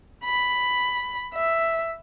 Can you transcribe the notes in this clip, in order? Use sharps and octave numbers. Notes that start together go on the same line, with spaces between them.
B5
E5